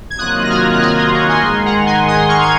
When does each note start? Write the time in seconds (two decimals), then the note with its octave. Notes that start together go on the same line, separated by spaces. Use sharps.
0.10 G#6
0.19 C3 D#3 F#3 A#3 F4 D#6 F#6
0.44 A#6
0.50 F6 G#6
0.74 F#6
0.82 F6 G#6
0.98 C6 D#6
1.13 A#5 C#6
1.29 G#5 C6
1.45 G#2 D#3 G#3 G#5 C6
1.65 F#5 A#5
1.86 G#5 C6
2.08 C6 D#6
2.29 C#6 F6
2.41 G#6